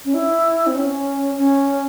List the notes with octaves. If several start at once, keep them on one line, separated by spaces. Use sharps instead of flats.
C#4
E4
C4
C#4
C#4